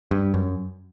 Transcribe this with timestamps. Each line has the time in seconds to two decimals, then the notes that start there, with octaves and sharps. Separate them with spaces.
0.11 G2
0.34 F#2